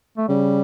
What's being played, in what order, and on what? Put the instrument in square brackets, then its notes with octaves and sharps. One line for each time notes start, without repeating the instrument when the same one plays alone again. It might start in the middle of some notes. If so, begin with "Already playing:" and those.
[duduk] A3
[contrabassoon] C#3 [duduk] G3